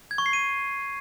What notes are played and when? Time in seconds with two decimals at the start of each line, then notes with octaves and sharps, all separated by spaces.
0.11 G#6
0.18 C#6
0.26 C7
0.33 D#7